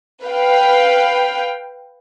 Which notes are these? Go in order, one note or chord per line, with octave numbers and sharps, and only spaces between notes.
B4 F5 G5